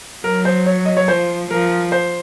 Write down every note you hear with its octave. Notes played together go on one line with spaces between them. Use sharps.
F#3 A#4
C5
C#5
D#5
C#5
F3 C5
F3 A#4
C5